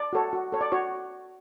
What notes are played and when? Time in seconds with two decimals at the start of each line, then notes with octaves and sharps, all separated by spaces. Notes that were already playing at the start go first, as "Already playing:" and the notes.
Already playing: D5
0.13 F#4 A4 C#5
0.33 F#4
0.52 A4 C#5
0.61 D5
0.72 F#4 C#5